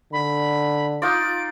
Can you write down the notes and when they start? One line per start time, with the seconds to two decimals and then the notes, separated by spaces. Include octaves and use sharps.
0.12 D3 B5
1.02 D#4 F4 D5 D7